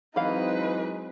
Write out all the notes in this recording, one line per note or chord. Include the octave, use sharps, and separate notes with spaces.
E3 F#3 G#3 C4 D#4 B4 F5